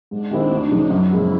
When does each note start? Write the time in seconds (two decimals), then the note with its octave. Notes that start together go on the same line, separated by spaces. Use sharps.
0.11 G#2 D4
0.31 D#3 G#3 C4 E4
0.51 D2 D#4
0.71 C#3 F3
0.90 F#2 E4
1.10 C#3 F3 G#3 B3